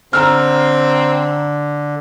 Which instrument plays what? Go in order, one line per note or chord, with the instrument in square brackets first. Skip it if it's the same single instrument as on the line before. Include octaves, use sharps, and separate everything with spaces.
[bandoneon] D3 [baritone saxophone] C4 [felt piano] A#5 E6 F6